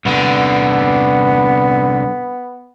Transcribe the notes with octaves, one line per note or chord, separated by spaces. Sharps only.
C2 D3 B3